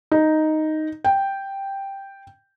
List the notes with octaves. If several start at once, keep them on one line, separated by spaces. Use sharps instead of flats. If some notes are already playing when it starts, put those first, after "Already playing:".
D#4
G5